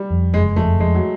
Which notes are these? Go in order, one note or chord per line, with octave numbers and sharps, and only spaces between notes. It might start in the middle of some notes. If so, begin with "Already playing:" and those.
Already playing: G3
F2
F#1 G#3
F2 A3
F2 G#3
F#3